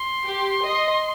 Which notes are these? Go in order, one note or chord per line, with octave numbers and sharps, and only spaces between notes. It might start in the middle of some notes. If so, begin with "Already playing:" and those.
Already playing: C6
G4
D#5